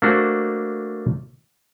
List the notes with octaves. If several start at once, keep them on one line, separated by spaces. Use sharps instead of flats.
A3 A#3 D4 F#4 C5